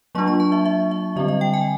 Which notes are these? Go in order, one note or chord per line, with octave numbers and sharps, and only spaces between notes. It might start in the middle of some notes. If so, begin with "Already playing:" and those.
F#3 A#3 D4 F4 C#6
C#6
A5
E5
E5
E5
D3 G3 C4 D#5
D#5
G5
G#5